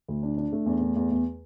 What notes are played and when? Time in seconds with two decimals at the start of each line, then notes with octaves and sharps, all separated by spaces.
0.08 D2
0.23 D4
0.38 D4
0.52 A3
0.66 E2
0.81 A3
0.96 E2
1.11 E2